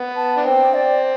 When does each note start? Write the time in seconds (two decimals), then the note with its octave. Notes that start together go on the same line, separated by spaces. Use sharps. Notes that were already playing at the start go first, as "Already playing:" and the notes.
Already playing: B3
0.16 A5
0.37 D4
0.45 C4 G5
0.74 D5